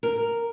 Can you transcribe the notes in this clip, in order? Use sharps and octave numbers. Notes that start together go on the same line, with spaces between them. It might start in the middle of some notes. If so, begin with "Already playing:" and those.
A#4